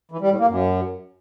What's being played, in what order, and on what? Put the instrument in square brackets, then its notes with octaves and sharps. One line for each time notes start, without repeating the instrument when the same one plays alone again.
[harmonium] E3
G3
A2
A#3
F#2